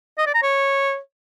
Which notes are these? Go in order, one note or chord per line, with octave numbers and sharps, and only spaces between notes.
D#5
D5
A#5
C#5